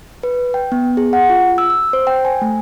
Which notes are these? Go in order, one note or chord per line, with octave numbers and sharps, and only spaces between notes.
B4
G5
B3
G#4
F#5
F4
E6
E6
C5
G5
G#5
A3